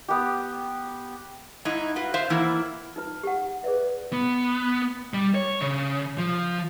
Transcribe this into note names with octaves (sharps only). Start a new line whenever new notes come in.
B3 G4
G#2 D#4 E4
F4 F#4 B4
C5 E5 F5
E3 A#3 B3 E4
D#4 F4 B4
G4 F#5
G#4 B4 D5 E5
B3
G3
C#5
C#3
F3